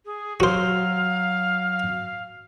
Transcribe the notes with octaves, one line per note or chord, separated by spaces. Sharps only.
G#4
F#3 F#4 C5 F5